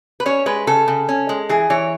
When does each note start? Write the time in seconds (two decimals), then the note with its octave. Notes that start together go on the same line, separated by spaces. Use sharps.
0.20 B4
0.26 C#4 C#5
0.46 G#3 B4
0.67 C#3 A4
0.88 C#3
1.09 C#4
1.29 G#3
1.49 E3 G#4
1.70 E3 C#5